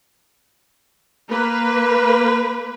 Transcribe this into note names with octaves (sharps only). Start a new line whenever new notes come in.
A#3 B4 B5